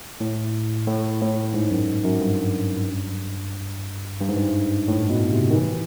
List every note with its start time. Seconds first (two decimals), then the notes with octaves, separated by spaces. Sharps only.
0.20 A2
0.87 A2
1.22 A2
1.54 G#2
1.71 F#2
2.04 F#2
2.21 G2
4.21 G2
4.29 G#2
4.37 G2
4.88 A2
5.10 B2
5.32 C3
5.50 D#3
5.55 E3